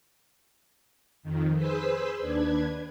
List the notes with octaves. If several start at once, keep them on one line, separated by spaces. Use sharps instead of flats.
F2 D#3
G#4 B4 C5 B5 C6 E6
D#2 D4 B4 G#6